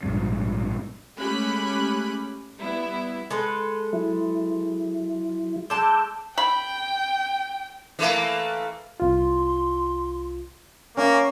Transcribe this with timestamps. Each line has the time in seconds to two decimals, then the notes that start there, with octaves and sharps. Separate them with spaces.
0.03 A#1 G#2 B2 G3
1.18 G#3 A3 C#4 G4 B5 F#6
2.58 G3 B3 E4
3.31 G#3 A4 B4
3.93 F#3 E4
5.70 G#3 A5 D6 E6 G6
6.38 G5 B5
7.99 E3 A3 A#3
9.00 C2 F4 C6
10.97 A#3 C#4 E5 C#6